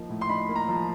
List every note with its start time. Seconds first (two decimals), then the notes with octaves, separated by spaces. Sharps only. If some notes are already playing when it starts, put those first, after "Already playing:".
Already playing: F3 A#3 D#4
0.10 A2
0.21 C6
0.29 D#4 B5
0.49 A#3
0.56 A#5
0.69 F3